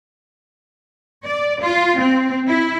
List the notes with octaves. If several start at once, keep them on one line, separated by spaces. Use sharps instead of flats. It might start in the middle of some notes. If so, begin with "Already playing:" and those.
D5
F4
C4
E4